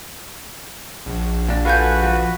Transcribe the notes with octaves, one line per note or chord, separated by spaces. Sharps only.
A#1
A#2 D4
F4 F#4 A4 B4 F5 F#5 G#5 G6
F3